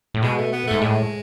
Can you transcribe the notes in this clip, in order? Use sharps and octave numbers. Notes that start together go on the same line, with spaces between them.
A2
B2 G#3
A3
B3
G#2 A3
A2 G#3